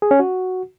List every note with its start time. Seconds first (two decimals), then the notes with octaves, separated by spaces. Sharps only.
0.02 G#4
0.11 C#4
0.20 F#4